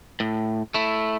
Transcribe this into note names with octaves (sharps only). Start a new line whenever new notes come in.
A2
A3 E4